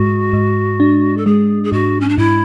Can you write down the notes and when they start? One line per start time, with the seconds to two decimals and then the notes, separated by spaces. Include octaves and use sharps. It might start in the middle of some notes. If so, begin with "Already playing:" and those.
Already playing: G#2 G#3 F#4
0.33 G#2
0.80 D4
1.17 A4
1.26 G#3 G#4
1.64 G#4
1.72 G#2 F#4
2.01 C#4
2.09 D4
2.18 G#2 E4